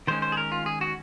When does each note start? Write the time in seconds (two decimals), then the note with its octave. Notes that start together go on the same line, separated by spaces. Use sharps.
0.07 D#3 G#3 C#4 C5
0.22 C5
0.32 G#4
0.37 A#4
0.52 F4
0.66 G#4
0.81 F#4